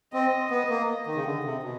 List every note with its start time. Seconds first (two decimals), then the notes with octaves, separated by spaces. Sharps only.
0.13 C4 D#5
0.50 B3
0.69 A#3
0.88 D#5
1.07 D#3
1.15 C#3
1.25 D3
1.44 C3
1.63 B2